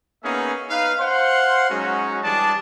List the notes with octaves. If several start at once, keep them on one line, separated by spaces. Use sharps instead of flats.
A#3 B3 C#4 D#4 G#4 E5
D#4 B4 F5
C5 F5 F#5 C6
F#3 G#3 C#4 D#4 F#4
E3 G3 D4 G#4 D5 A5